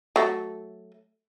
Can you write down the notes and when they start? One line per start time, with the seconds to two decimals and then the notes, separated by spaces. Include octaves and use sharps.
0.16 F#3 A3